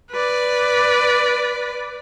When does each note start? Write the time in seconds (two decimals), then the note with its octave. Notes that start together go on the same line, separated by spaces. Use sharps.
0.11 B4 D5